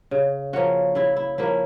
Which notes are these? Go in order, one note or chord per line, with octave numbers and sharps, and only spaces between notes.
C#3
F3 A#3 C#4 F#4
C#3 E4
E4
F3 A#3 C#4 E4